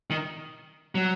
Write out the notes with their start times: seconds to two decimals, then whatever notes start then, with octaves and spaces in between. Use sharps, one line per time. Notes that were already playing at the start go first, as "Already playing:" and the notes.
0.10 D#3
0.95 F#3